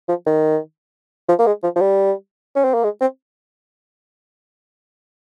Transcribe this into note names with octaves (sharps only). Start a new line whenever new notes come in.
F3
D#3
F3
A#3
G#3
F3
F3
G3
C#4
C4
A#3
G#3
C4